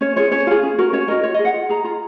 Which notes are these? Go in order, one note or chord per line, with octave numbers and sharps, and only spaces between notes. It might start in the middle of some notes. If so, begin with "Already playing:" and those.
C#4 C#5
F4 G#4 C#5
C#4 C#5
F4 G#4
C#4
F#4 A#4
C#4 C#5
F#4 A#4 D#5
F4 C#5
D#5
G#4
F#5
F4
G#4 A#5
F4 A#5